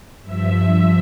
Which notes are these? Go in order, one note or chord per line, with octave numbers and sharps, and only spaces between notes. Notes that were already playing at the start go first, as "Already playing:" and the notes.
G2 F3 E5